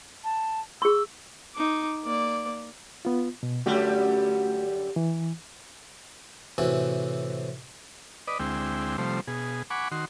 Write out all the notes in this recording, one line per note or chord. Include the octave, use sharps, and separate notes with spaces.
A5
G#4 C#6 E6
D#4 D6
A#3 D5
B3 F4
B2
F#2 D3 G3 A3 F#4 G4
E3
A2 C3 E3 F#4
B4 D5 D#5
D2 G#3 C4 E4 G5
C3 F3 G3 A3 C5
B2 G#4
F#5 G#5 B5 C#6 D6
D#3 F#4 C6